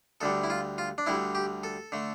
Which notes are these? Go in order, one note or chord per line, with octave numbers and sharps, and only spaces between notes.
D2 D3 G3 A4
E4
F4
F4
D4
D2 D3 G3 E4
G4
A4
D3 A3